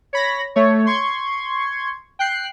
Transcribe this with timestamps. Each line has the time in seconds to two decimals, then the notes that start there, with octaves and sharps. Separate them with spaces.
0.13 C#5 B5 A#6
0.56 A3 C#5
0.87 C6 C#6 G#6
2.19 G5 F#6 C7